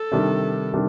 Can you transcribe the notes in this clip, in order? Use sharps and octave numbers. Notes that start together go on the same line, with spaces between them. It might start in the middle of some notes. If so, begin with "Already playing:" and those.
Already playing: A4
C3 D#3 G3 D4
C3 D#3 G3 D4